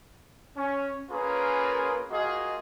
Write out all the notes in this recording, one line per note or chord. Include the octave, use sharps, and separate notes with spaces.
C#4
A#3 C#4 F4 G#4 A#4 B4
A#3 F4 F#4 G#4 D#5